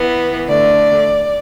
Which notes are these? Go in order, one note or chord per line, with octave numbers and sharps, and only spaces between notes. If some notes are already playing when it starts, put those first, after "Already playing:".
Already playing: E3 B3
D3 A3 D5